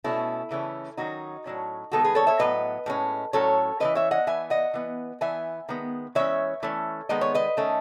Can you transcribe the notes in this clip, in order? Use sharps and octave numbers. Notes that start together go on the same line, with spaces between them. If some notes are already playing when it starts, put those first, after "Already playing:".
B2 A3 C#4 E4
C#3 E3 A3 C#4
D#3 F#3 C#4 D#4 F#4
A2 F#3 C#4
D#3 G#3 B3 F#4 A4
G#4 B4
A4 C#5
C#5 E5
A2 F#3 B3 B4 D#5
A2 G#3 C#4
A2 F#3 C#4 A4 C#5
E3 G#3 C#4 B4 D#5
C#5 E5
D#5 F#5
E3 B3 E5 G#5
D#5 F#5
E3 B3
E3 B3 E5 G#5
D#3 G#3 B3
E3 G#3 C#4 C#5 E5
E3 A3 C#4
D#3 G#3 B3 D#5
C#5
B4 D#5
D#3 A3 C#4